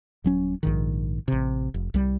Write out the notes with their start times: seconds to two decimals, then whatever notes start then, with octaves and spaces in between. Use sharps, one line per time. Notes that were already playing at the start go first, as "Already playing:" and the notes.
0.24 D#1 F#3 C#4
0.63 A#1 G#2 D#3
1.28 A1 C3
1.74 F1
1.94 C2 G3